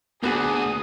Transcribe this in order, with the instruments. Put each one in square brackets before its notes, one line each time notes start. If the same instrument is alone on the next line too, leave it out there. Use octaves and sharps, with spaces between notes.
[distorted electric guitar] D2 [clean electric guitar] A#3 F#4 G#4 [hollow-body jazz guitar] B3 D4 F#5 [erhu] D#6